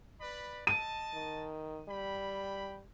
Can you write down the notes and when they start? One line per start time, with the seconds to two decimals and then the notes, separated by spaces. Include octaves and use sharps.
0.21 B4 D5 B5
0.67 D#5 A5 D#7
1.14 D#3
1.89 G3 G5 B5